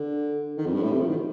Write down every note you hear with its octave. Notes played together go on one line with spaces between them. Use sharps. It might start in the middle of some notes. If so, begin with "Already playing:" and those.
Already playing: D3
D#3
F2
G2
A2
C3
F3
D#3